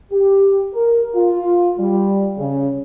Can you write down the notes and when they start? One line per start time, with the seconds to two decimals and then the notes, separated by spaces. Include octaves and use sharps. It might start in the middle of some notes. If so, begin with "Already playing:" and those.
0.12 G4
0.74 A#4
1.15 F4
1.79 G3
2.38 C#3